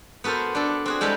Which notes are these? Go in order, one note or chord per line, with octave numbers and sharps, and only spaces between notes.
B3 F#4 A4 A#4 C5
D4 A4
C4 F#4 G#4
G3 G#3 E4 G4 A4 B4